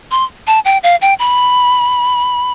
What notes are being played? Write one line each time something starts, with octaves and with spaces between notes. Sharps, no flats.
C6
A5
G5
F5
G5
B5